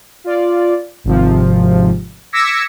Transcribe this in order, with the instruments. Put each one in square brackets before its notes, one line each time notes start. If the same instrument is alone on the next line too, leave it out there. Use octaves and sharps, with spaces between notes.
[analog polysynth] F4 D5
G#1 C3 F3
D6 E6 G#6 A#6 B6 C#7